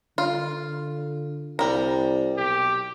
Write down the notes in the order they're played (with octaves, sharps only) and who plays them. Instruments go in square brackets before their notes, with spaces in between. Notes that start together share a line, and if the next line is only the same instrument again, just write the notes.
[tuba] D3 [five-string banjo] F4
[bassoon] C2 [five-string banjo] G3 A#5
[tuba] B1 [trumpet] G4